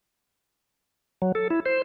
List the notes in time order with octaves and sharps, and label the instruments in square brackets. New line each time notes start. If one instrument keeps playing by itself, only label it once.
[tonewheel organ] F#3
A4
E4
C5